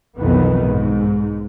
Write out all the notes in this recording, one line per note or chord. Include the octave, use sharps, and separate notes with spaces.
B1 F2 D#3 E3 B3
G#2